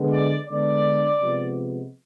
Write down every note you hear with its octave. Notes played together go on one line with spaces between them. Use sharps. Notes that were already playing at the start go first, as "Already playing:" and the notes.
Already playing: D3 G#3 B3
D5
D3 G#3 B3 D4 D5
C3 F3 G#3 B3